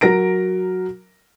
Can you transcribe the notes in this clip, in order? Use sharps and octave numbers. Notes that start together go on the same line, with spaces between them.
F#3 A#4 A#6 D7